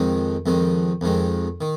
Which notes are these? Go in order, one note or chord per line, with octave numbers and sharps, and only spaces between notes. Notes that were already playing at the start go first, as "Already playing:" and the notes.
Already playing: F2 D#3 G#3
F2 D#3 G#3
F2 D#3 G#3
D#3